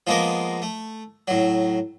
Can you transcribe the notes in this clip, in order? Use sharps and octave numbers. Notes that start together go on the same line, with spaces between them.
F3 G#3 A#3 B3 A#4
A3
A2 F#3